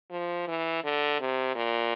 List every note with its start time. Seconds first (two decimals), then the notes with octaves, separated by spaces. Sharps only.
0.11 F3
0.48 E3
0.84 D3
1.20 C3
1.55 A#2